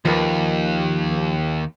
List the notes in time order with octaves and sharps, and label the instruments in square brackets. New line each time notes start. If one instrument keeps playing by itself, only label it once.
[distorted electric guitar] D#2 [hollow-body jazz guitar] F3 A#4 B4